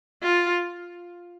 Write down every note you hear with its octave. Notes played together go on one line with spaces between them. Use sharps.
F4